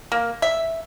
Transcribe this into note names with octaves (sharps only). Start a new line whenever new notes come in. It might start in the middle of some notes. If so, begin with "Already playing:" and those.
A#3
E5